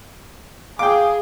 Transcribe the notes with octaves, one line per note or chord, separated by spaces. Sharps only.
G#4 F5 G5 D6